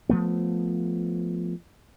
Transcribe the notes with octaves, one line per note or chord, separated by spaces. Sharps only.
F3 A3 B3